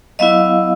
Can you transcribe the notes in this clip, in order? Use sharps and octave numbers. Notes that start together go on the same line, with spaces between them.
F#3 B3 E4 D#5 F5